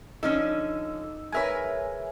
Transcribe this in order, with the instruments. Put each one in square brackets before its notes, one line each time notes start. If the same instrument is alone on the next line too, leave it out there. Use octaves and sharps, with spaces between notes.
[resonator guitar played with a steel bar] D3 F3 C#4 [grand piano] D#4 [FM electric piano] E6
[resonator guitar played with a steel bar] G#3 A#4 B4 [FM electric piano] C#5 E5 G#5